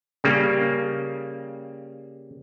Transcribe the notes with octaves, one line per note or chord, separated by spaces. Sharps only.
C#3 G3 A#3